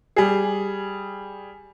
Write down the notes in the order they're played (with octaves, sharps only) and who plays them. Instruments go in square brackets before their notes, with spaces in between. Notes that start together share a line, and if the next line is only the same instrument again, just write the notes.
[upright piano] G3 G#4